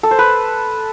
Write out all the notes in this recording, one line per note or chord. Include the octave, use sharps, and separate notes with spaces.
A4
C5
B4